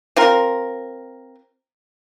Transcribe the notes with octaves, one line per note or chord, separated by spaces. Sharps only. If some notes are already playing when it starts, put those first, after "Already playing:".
C4 F4 A#4